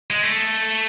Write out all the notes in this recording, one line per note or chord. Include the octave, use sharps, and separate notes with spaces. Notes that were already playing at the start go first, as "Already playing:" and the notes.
G#3
A3